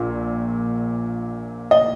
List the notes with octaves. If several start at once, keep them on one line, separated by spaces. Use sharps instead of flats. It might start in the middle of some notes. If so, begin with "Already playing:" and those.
Already playing: A#1 A#2
D#5